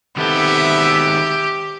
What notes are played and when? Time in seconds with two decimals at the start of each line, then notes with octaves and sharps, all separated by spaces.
0.17 D#3 B3 C4 G4 A4 E5